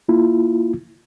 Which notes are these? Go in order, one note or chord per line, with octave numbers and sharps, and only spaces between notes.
A#3 E4 F4